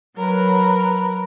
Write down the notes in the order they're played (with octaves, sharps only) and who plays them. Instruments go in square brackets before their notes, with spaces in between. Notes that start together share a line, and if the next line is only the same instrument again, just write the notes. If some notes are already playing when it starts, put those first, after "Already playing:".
[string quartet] F#3 A#4 B4